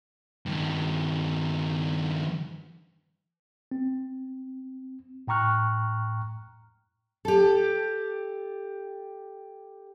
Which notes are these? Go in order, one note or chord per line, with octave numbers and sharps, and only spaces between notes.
G2 D#3
C4
A2 G5 A#5 C#6 F6 F#6
G4 A4